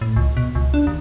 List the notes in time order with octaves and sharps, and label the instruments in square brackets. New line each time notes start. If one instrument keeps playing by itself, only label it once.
[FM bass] A2
C#2
B2
C#2
D4
D#2